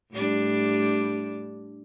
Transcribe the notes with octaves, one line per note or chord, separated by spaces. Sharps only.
A2 G3 D4